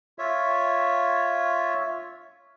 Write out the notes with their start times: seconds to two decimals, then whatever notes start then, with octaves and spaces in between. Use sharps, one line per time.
0.19 F4 C#5 E5